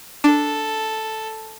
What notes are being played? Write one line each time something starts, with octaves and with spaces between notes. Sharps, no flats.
D4 A4